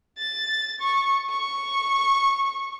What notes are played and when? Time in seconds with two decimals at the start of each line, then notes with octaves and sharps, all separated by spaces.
0.18 A6
0.81 C#6
1.29 C#6